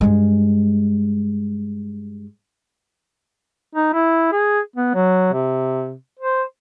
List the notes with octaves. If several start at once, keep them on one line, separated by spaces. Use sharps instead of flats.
G2 G#3
D#4
E4
G#4
B3
F#3
C3
C5